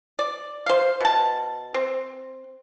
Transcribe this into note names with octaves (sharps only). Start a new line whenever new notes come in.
D5
C5 F5
B2 A5
C4